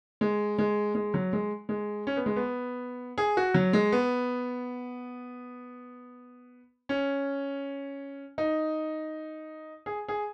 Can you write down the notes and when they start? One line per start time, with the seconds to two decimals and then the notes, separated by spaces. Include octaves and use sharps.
0.21 G#3
0.58 G#3
0.95 G#3
1.14 F#3
1.33 G#3
1.69 G#3
2.07 C#4
2.17 B3
2.26 G#3
2.36 B3
3.18 G#4
3.37 F#4
3.54 F#3
3.73 G#3
3.92 B3
6.89 C#4
8.38 D#4
9.86 G#4
10.08 G#4